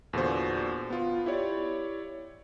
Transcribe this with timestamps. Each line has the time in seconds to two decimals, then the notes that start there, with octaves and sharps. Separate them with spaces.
0.13 E2 A#2 D3 F#4 C5
0.90 B3 F4
1.26 E4 G4 C#5 D5